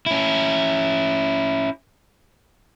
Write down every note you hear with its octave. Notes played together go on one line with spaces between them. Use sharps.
C#4 E4